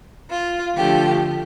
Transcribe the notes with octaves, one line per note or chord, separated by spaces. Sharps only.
F4
D3 F3 A3 G4